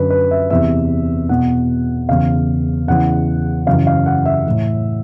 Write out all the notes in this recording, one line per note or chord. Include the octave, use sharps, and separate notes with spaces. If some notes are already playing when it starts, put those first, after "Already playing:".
Already playing: F#2 D3 B4
B4
E5
E2 C3 E3 E5
E2 B2 F#5
E2 C#3 E3 F5
E2 C#3 E3 F#5
F#2 C#3 E3 F5
F5
F#5
E5
A2 E3